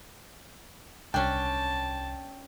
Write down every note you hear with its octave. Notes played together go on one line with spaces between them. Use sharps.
C2 C#4 D4 G5 A5